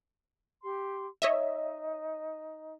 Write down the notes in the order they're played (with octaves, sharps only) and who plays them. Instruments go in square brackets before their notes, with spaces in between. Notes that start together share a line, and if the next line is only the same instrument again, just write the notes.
[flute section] G4 C6
[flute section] D#4 [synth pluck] C#5 D#5 E5